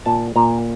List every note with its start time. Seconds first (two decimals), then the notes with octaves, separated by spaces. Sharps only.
0.06 A#2 A5
0.36 A#2 A#5